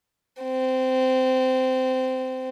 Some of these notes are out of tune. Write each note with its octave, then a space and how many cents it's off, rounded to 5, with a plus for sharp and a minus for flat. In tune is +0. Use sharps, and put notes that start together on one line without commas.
C4 -15